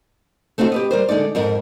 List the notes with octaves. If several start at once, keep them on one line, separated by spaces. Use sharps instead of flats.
A3 C4 D#4 F4 F#4
G4 B4 D#5
G3 A#4 C5
D3 G#3 D#4 D5
F2 G#2 A#4